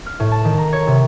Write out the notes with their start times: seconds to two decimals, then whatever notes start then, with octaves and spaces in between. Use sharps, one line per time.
0.06 F6
0.20 A2
0.32 A5
0.45 D#3
0.58 A#5
0.73 C#5
0.87 C3